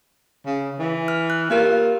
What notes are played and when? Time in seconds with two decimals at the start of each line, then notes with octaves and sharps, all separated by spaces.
0.46 C#3
0.79 E3
1.08 F6
1.30 F#6
1.50 A#3 F4 G4 A#4